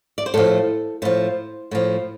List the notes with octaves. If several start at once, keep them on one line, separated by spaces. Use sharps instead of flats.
D5
C5
A2 F3 A4
A2 F3 C5
A2 F3